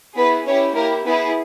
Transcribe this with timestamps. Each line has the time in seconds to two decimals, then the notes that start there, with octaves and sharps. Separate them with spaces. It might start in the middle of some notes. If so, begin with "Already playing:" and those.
0.16 B3 E4 G#4 B4
0.46 C#4 E4 G4 C#5
0.75 A#3 E4 G4 A#4
1.05 B3 E4 G#4 B4